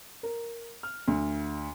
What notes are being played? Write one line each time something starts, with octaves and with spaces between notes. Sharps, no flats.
A#4
F6
D2